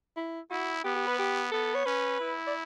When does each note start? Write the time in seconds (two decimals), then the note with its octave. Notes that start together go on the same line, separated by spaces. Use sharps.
0.17 E4
0.50 E4 F#4
0.84 B3 G4
0.96 G4
1.07 B4
1.19 G4
1.52 B3 A4
1.75 C#5
1.86 C#4 B4
2.20 E4
2.47 D5